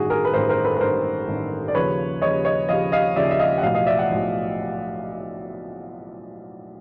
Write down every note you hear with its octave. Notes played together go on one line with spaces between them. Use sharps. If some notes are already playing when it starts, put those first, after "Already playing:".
Already playing: A1 G2 D#3 F#4 G#4
G#4 A#4
B4
A1 G2 D#3 A#4 C5
A#4 C5
A4 B4
B4
A1 G2 D#3 A#4 C5
A1 G2 D#3
D5
D#2 C#3 F3 B4 C#5
D#2 C#3 F3 C#5 D#5
C#5 D#5
D#2 C#3 F3 D#5 F5
D#5 F5
D#2 C#3 F3 D5 E5
E5
D#5 F5
F#5
B1 A2 F3 D#5 F5
D#5 F5
D5 E5
E5 F#5
B1 A2 F3